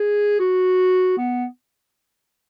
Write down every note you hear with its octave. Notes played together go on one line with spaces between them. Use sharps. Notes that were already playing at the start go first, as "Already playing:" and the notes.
Already playing: G#4
F#4
B3